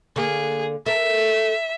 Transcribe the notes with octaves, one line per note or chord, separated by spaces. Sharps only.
D3 A#3 G#4
A4 A#4 E5